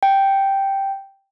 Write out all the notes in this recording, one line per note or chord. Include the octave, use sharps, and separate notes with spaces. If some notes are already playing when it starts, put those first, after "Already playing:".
G5